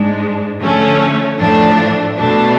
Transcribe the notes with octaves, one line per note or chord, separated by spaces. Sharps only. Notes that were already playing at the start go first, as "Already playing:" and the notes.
Already playing: G#2 G#3 D4
D3 F3 A3 C#4
A2 F3 A3 D4
B2 A3 D4